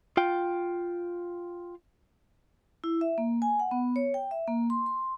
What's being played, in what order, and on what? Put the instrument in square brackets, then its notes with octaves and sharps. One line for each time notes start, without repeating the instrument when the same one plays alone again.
[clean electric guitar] F4 G5
[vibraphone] E4
E5
A#3
G#5
F#5
B3
C#5
G5
E5
A#3
C6
C6